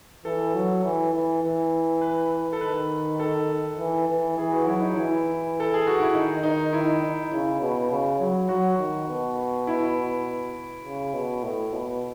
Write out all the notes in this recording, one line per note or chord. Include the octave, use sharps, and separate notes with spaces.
E3 A4
F#3
E3
E3
E3
B4
A4
D#3 B4
A4
E3
E3
E3 G#4
F#4
F#3 E4
D#4
E3 E4
A4
G#4
F#4
E4
D#3 D#4
D#4
E4
D#4
C#3 E4
B2
C#3
F#3
F#3 F#4
D#3
B2
E4
C#3
B2
A2
B2